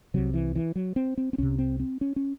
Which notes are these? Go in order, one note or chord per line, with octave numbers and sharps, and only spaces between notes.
C2 C3 F#3
E3
E3
F#3
C4
C4
C4
C2 C3 C#4
C4
C4
C#4
C#4